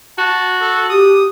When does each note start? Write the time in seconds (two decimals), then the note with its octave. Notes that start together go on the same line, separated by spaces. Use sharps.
0.18 F#4 A5
0.61 A4
0.90 G4 D#6